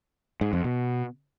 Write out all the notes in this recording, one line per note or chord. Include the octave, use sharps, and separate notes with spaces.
G#2
F2
B2